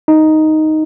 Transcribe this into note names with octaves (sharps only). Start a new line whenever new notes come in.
D#4